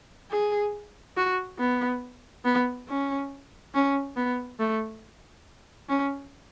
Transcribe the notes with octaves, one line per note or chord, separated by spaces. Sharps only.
G#4
F#4
B3
B3
C#4
C#4
B3
A3
C#4